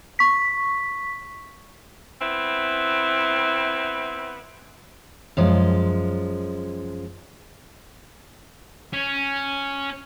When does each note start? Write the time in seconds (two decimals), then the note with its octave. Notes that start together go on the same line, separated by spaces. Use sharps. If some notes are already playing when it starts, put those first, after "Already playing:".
0.19 C#6 B6
2.21 B3 C4 E4
5.37 F#2 F3 G#3
8.94 C#4